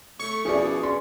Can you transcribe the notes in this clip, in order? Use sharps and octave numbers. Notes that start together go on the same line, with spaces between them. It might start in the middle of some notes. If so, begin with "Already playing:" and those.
A3 C#5 C#6
B2 F3 C#4 E4 G#4 D5
C#4 D4 C6